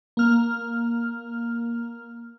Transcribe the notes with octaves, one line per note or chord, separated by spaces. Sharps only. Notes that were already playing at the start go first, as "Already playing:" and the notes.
A#3 F6